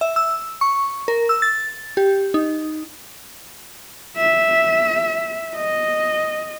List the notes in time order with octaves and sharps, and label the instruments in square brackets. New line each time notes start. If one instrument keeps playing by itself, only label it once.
[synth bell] E5
E6
C#6
A#4
E6
A6
G4
D#4
[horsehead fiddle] E5
D#5